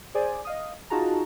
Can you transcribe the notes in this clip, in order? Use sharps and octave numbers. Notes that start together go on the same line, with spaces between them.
G#4 C5 D5 G#5
D#5 F5 D#6
D#4 F4 F#4 G#4 A5 A#5